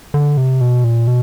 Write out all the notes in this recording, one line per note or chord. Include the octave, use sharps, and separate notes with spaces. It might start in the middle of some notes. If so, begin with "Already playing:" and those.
D3
C3
B2
A#2
B2